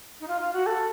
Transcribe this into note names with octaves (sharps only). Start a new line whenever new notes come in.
D#4
F4
F4
F#4
A4